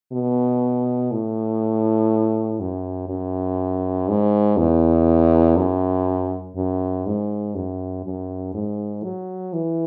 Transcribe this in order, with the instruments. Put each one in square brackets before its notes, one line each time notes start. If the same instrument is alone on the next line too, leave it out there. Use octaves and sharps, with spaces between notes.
[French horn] B2
A2
F#2
F#2
G#2
E2
F#2
F#2
G#2
F#2
F#2
G#2
F#3
E3